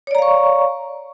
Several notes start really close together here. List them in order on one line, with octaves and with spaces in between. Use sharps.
C#5 D5 A#5 F5 C#6